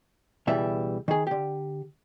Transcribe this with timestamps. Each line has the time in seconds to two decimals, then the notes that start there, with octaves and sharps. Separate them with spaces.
0.47 C#2 B2 E3 G3 E5
1.08 D#3 G#4
1.27 D3 G4